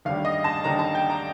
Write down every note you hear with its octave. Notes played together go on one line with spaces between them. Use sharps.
D#2 D3 G3 F5
D#5
A5
D#2 D3 G3 A#5
A5
G5
A#5